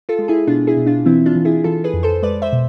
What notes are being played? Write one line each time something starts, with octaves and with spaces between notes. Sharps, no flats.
F4 A4
G#3
E4 G#4
B2 D4 F4
E4 G#4
B2
D4 F4
E3 C4 E4
D4 F4
E3
E4 G#4
E3 F4 A4
G#4 B4
F2
A4 C5
G#3 B4 D5
C5 E5
B2